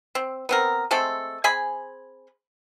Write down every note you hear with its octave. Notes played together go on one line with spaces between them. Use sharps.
C4
B3 C4 A#4
G#3 A3 C4 A4
C4 G#4 G#5 B5